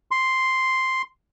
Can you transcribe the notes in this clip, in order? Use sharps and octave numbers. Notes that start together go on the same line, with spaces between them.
C6